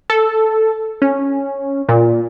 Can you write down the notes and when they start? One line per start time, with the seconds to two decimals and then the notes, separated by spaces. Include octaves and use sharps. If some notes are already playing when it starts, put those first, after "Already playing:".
0.10 A4
1.02 C#4
1.89 A#2